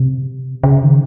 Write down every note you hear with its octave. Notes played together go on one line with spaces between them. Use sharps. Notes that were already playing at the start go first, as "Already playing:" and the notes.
Already playing: C3
C#3
D#3